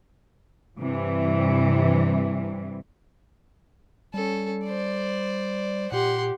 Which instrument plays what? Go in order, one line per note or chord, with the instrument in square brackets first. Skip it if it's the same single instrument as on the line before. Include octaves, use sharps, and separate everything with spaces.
[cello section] G2 C3 E3
[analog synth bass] G3 [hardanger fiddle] C#4 A4
[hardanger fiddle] C5 D5
[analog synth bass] A#2 [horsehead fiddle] G4 [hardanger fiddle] F#5 C6